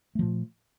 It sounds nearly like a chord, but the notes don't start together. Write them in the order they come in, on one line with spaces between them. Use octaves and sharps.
A3 F3 A#2